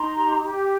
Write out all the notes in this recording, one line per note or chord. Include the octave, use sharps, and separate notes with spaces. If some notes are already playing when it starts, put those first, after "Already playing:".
Already playing: D#4 A#5 C6
G4
G4